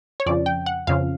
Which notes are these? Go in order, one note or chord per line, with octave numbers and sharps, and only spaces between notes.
C#5
F2 C#3 F3 D5
G5
F#5
F2 C#3 F3 F5